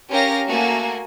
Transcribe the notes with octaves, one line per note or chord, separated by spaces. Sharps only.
C#4 G4 A#4 F5 A#6
A3 A#3 F#4 G#5